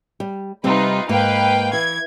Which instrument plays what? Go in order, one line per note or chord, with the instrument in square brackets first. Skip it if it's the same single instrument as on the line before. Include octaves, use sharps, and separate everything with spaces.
[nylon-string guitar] G3
[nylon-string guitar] C3 G3 C4 [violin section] D#4 F4 B4
[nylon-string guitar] G#2 A#3 D#5 [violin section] B4 F5 G5
[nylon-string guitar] E3 [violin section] G#6